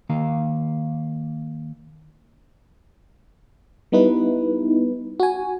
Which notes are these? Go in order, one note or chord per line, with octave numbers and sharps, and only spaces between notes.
D#3 A#3 F5 A#5
G3 B3 D#4 E4 B4
F#4 G#5